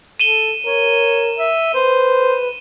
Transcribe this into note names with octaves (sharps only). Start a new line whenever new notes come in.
A4 D#7 E7 G7
A#4 C#5
E5
B4 C5